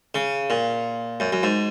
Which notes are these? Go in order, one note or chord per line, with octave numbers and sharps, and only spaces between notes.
C#3
A#2
F#2
F#2
G#2